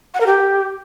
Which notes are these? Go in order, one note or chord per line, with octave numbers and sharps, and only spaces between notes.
F#5
A#4
G4